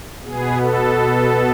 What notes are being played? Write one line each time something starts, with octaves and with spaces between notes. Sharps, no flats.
B2 B3 G#4
A4